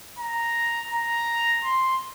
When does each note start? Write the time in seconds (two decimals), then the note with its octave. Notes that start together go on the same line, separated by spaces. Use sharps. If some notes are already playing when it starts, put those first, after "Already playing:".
0.19 A#5
0.92 A#5
1.64 C6